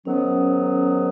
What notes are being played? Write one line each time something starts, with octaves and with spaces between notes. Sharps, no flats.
G#2 D#3 F#3 B3 C#4